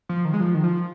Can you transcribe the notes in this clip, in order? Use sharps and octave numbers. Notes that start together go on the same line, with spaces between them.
F3
D#3
G#3
F3
D#3
F3